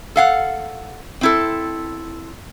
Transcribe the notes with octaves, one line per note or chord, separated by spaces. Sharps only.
A4 F5 F#5
C4 E4 A4